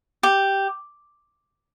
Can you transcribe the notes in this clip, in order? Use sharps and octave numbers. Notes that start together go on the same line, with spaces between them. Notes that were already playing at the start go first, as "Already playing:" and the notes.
G4